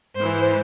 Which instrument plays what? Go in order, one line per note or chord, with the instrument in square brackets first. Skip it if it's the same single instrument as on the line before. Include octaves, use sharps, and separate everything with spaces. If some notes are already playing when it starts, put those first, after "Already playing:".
[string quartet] G#2 E3 C5